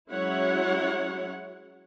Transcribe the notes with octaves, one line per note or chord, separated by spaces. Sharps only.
F#3 G#3 C#4 E4 C#5 F#5